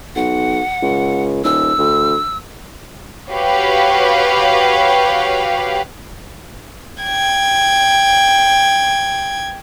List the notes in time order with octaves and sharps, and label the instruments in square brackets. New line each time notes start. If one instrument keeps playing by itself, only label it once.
[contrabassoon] B1 [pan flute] F#5
[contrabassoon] C#2
[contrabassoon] D#1 [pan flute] E6
[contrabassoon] D2
[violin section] F#4 G4 B4 C#5 F5
[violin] G5 G#6